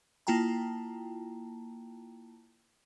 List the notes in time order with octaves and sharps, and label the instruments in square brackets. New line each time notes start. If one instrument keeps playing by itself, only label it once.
[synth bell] A#3 E4 F4 G5 A5 A#5